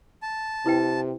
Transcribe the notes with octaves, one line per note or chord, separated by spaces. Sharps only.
A5
C3 E4 B4 G5